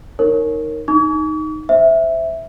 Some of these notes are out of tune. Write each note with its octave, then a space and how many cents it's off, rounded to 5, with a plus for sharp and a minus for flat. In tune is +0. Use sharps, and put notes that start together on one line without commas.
D#4 +0 A#4 -10 C#5 -15
D#4 +0 C#6 +45
C5 +0 E5 +0